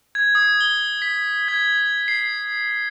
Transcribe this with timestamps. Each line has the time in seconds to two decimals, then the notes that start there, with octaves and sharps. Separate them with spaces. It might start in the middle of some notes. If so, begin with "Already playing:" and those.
0.15 G#6
0.35 D#6
0.61 G7
1.02 B6
1.48 G#6
2.08 C7